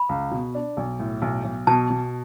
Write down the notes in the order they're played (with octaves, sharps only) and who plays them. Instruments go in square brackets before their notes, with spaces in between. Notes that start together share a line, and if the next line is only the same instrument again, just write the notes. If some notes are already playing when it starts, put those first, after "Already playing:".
Already playing: [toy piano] B5
[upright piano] C#2
B2
D4
B1
A2
B1
B1
[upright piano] B2 [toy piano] A5
[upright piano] B2